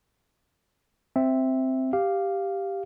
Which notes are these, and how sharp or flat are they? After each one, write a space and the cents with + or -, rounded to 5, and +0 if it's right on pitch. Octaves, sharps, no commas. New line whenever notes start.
C4 +0 E5 +0
G4 +0 F5 +0